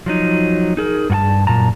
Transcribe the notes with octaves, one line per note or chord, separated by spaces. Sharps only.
F3 F#3 D#4
D#4 G#4 A#4
G2 F#4 A5
F#2 A#2 A5 A#5